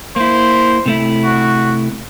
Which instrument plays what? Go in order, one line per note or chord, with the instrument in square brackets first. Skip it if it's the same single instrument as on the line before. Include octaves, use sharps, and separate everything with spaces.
[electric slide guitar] A#3 E4 [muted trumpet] C5
[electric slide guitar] C3 A3 E4
[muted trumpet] F#4